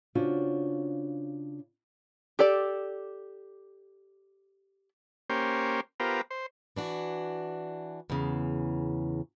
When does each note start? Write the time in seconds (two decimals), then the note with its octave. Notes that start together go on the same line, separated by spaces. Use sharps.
0.15 C#3 D4 F4 F#4 C5 C#5
2.39 G4 A4 D5
5.30 A#3 C#4 G4 C5
6.00 B3 F4 G4 A#4 C5
6.31 C5
6.76 E3 D4 F#4
8.10 E2 C#3